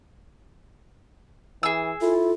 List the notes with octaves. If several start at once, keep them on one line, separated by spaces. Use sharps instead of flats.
E3 G#4 E6
E4 F4 A4